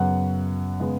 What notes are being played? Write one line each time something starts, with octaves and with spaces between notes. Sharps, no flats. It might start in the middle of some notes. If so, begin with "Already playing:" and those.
Already playing: F#2 C#3 F#3 B3 F#5
C#3 G#3 B3